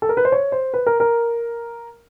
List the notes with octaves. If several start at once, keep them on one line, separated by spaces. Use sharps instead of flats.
A4
A#4
B4
C5
C#5
C5
B4
A#4
A#4